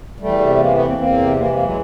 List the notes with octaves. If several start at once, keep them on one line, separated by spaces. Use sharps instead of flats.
E2 G3 A3
C3
E3 G#3 A#3
A3 B3
E2
A#3 C4
E2 A#3 C4
C3
E3 A#3 C4
G#3 A#3
E2
F#3 G#3